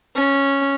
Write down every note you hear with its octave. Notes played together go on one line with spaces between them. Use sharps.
C#4